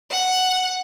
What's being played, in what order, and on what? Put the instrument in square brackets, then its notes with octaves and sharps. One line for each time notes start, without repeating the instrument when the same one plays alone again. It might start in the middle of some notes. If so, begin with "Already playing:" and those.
[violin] F#5